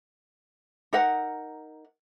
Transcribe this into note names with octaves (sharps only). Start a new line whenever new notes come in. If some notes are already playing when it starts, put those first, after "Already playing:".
D#4 A#4 F#5